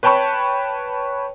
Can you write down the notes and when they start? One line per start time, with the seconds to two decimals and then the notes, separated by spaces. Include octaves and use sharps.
0.03 B4 C#5 G5 A5 B5 C#6